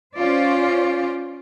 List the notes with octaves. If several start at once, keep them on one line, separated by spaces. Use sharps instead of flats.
C#4 F4 C5 D5